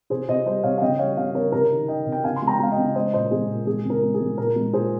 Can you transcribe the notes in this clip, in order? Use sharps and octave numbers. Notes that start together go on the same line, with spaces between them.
C3 G#4 C5
C3 C5 D#5
G3 C5 D#5
C3 C#5 F5
F5
C#3 D#5 G5
G3 C#5 F5
C#3 C#5 F5
C#3 A#4 C#5
C3 A#4
D#3
D#3 D#5 G5
C3
G5
C#3 F5 G#5
C6
G#3
G5 A#5
G#3 F5
D#5 G5
C#3
G#3 C5 D#5
A#2 C5 D#5
G#3 G#4
A#2
G#3 G#4
C#3 A#4
G#3
G#4
G#3
A#2 A#4
G#3
A#2 G#4 C5